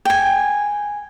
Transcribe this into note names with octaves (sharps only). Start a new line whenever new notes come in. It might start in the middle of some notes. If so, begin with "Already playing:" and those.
G5 G#5